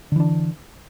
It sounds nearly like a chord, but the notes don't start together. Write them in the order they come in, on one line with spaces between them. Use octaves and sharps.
D3 E3 D4